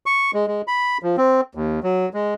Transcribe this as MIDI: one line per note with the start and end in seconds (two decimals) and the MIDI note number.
0.06 0.31 85
0.34 0.46 56
0.47 0.62 56
0.68 0.98 83
1.03 1.16 53
1.17 1.41 60
1.55 1.80 39
1.83 2.09 54
2.14 2.34 56